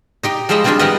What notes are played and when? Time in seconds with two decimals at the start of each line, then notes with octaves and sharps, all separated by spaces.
0.23 D#4 G4 G5
0.49 F3 G3 G#3 C5 D#5 E5
0.64 G3 C4 D4 F4 G#4 G5
0.79 E3 B3 C4 A#4 B4 D#5